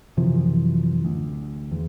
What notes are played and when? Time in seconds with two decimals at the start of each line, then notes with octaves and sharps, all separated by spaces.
0.17 F#2 C3 E3 F3
1.05 D2
1.72 E2